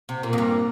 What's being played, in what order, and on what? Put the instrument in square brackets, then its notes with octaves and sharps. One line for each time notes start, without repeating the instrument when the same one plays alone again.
[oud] C3
[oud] A#2 [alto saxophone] A#3
[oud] F2
G2